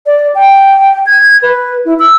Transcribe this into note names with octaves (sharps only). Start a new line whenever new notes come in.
D5
G5
G#6
B4
E4
E6